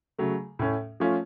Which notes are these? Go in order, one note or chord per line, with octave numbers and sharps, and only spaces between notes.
C#3 F#3 A3
A2 A3 C#4
F3 A3 C#4 F4